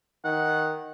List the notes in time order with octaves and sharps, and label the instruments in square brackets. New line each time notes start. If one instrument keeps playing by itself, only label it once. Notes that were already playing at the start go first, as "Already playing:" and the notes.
[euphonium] D#3 [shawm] F#5